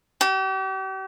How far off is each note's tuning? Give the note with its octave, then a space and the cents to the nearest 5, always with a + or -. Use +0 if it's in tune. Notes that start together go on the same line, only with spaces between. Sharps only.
G4 -40